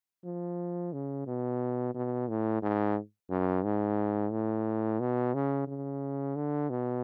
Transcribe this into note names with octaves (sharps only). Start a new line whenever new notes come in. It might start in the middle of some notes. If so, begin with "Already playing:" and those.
F3
C#3
B2
B2
A2
G#2
F#2
G#2
A2
B2
C#3
C#3
D3
B2